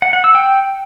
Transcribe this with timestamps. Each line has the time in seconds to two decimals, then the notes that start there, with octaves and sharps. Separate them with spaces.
0.02 F#5
0.13 F#5
0.24 E6
0.35 G5